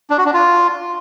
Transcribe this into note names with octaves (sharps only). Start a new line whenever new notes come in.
D4
F#4
D4
F4